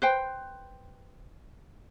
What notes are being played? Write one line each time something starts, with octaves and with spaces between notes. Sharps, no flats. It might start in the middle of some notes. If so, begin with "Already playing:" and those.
B4 C5 G5